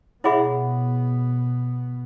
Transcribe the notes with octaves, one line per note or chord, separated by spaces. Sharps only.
B2 B3 E4 G#4 C#5 E5 F#5 B5